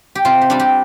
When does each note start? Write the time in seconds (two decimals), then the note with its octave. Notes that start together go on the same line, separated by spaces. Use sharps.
0.15 G4
0.25 C3 F4
0.42 G4
0.50 G3 D4
0.60 G4